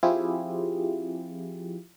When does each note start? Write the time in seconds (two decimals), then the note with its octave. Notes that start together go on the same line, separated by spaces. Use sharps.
0.03 F3 C4 E4 F4 G4 G#4